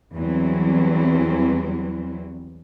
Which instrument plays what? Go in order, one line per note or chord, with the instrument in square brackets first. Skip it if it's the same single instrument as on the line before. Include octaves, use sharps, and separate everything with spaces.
[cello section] E2 E3 F#3 G3 C4